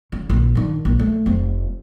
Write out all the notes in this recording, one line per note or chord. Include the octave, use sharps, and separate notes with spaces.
C#3
A#1
D#3 D4
A#1
A3
F1 C4